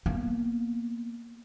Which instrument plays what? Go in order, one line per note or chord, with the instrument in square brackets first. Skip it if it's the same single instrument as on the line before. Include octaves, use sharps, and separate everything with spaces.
[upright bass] A#3 B3